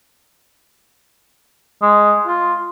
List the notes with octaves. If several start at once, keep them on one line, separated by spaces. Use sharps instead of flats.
G#3
F4